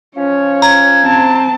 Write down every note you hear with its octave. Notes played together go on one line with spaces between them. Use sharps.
F3 C#4 C#5
A#5 G#6
C4 A5